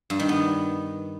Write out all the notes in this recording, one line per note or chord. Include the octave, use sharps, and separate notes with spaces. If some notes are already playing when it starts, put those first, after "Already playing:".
G2
D#3
B3